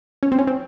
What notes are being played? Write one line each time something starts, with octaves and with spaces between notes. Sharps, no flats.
C#4
C4
C#4
C4